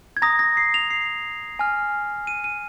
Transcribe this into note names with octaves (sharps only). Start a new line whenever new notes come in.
G#6
A#5 D#6 A#6
A#6
C7
F7
C7
G#5 F6
D#7
D#7